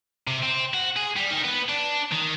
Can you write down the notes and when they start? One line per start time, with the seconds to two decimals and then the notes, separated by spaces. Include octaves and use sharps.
0.27 C3
0.43 C4
0.74 F#4
0.97 G#4
1.17 G3
1.31 D#3
1.44 B3
1.69 D4
2.11 D#3